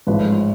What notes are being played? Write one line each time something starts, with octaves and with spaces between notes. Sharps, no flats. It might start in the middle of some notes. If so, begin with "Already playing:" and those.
A1 G#2 F3 G#3 B4